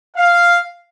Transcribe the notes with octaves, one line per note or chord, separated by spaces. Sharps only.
F5